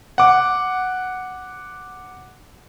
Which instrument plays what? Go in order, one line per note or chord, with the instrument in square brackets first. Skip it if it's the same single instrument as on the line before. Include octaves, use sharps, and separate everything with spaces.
[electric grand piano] F#5 D6